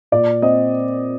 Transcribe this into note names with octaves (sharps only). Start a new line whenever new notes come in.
A#2 D5
C4 D#5